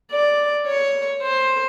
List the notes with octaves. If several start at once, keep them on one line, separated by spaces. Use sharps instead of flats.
D5
C#5
C5